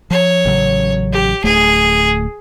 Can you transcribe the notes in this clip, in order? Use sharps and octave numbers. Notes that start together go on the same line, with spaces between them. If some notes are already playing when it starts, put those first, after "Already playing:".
F3 C#5
A1 C#3 F#3
G4
D1 A3 G#4